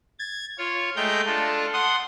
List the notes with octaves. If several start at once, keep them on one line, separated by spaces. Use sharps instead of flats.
G#6 A6
F4 C#5
G#3 A3 G5 A#5 G6
D4 F4 A4
F#5 C6 D#6